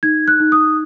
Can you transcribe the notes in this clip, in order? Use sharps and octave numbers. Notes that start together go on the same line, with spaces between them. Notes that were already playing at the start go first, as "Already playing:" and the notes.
D#4 G#6
F#6
D#4
D#6